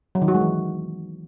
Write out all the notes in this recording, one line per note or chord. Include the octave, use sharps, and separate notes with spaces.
F#3
D#3
F#4
G#3
E3